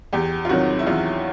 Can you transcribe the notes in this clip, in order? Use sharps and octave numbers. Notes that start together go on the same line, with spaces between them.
E2 G4
F4
C3 D#3 F#3 F#4
E4
E2 F4